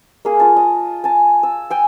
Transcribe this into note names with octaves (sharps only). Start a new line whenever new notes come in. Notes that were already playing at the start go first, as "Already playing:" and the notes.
A#3 G#4
F4 A5
D#5
G#5 A5
E6
G5 G#5